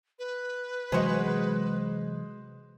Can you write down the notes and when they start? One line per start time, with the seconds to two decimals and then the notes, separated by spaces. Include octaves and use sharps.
0.19 B4
0.92 C3 E3 F#3 G#3 F#4 C5 D#5